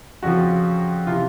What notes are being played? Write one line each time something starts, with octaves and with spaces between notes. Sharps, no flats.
F2 C#3 F3 F#4
C3 E3 F4